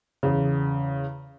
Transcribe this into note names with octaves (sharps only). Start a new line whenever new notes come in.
E2 C#3